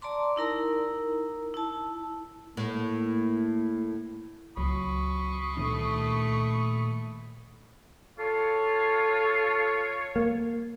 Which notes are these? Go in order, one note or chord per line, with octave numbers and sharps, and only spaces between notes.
D5 A5 A#5 C6 D6
D#4 E4 A#4 A#5
E4 A5
A2 A#3
C#2 F#3 B5 C#6 D#6
A#2 D#3 A3 D4
F4 A4 C#5
A#3